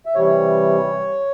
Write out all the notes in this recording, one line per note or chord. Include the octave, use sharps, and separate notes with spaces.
E5
C3 E3 G3 C#5